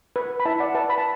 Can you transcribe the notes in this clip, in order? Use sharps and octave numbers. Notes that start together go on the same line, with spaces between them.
B4
B5
E4 E5 A5
D5 F#5
B4 E5 A5
B5
A5